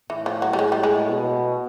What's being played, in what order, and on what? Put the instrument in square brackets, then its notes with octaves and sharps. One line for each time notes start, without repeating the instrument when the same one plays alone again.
[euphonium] A2 [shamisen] E3
[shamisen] F3
F#3
G3
G#3
G3
G#3
[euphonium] B2